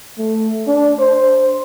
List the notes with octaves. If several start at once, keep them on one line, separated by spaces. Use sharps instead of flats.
A3
D4
C5